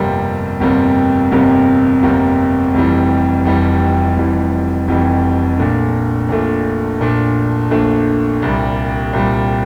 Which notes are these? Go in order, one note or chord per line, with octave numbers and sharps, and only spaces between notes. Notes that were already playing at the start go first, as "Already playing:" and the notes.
Already playing: G1 F2 C3 G3 A#3
G1 F2 C3 G3 A#3
G1 F2 C3 G3 A#3
G1 F2 C3 G3 A#3
F1 F2 E3 G3
F1 F2 E3 G3
F1 F2 E3 G3
F1 F2 E3 G3
A#1 A#2 A3 D4
A#1 A#2 A3 D4
A#1 A#2 A3 D4
A#1 A#2 A3 D4
C2 A#2 G3
C2 A#2 G3